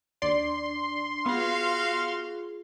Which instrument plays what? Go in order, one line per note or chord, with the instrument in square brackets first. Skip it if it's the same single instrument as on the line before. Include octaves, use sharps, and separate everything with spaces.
[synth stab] D#2 D5 [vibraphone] D4 [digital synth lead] C6
[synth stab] B3 [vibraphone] F4 G#4 [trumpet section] F#4 F5